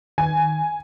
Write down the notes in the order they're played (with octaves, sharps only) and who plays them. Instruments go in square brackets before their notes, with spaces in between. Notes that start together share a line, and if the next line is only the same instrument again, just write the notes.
[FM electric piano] D#3 [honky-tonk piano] G#5